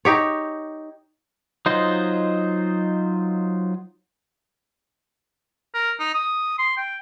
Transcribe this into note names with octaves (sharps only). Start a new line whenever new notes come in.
D#4 G4 C#5
F#3 D#4 F4 C5 D#5
A#4
D#4
D#6
C6
G5